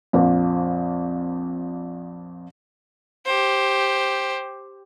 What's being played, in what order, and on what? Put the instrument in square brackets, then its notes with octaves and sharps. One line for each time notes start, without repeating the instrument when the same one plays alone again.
[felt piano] A#1 F2
[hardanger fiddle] G4 C5